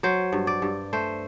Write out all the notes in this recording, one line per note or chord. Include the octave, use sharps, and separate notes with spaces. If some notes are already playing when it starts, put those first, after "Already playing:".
F#3 C5
G2
D5
G2
A3 C5